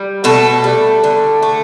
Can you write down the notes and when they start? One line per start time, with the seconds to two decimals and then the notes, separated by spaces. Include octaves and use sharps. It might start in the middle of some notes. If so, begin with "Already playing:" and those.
Already playing: G3
0.24 B2 A3 A4
0.64 G3
1.04 D3
1.42 A3